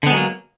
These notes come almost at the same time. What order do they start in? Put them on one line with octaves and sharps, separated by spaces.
D3 B3 G#3 F#3 A#3